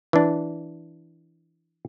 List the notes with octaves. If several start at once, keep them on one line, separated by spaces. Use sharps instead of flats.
E3 D4